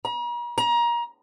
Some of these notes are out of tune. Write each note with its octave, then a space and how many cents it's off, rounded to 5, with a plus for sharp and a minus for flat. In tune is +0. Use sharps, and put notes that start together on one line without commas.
A#5 +45
A#5 +25